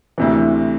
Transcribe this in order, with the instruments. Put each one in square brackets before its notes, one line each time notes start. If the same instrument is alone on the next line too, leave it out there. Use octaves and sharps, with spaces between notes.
[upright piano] D2 C3 E3